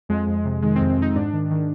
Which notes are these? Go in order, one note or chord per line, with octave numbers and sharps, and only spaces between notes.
F2 G#3
F2
C3
D#3 G#3
C4
F2
C4
F2 D#4
G#2 D4
D#3
D#3